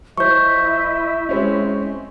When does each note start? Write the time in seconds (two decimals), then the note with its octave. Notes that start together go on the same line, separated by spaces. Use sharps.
0.18 F3 E4 C5 D#5 E5 C#6 G6
1.29 G#3 C4 C#4